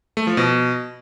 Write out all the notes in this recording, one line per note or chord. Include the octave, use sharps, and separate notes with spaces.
A3
F3
B2